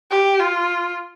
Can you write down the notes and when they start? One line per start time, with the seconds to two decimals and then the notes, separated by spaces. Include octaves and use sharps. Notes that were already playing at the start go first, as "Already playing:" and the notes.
0.11 G4
0.39 F4